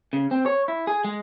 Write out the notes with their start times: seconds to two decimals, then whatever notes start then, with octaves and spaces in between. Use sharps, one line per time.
0.13 C#3
0.31 C4
0.46 C#5
0.68 E4
0.87 G#4
1.04 G#3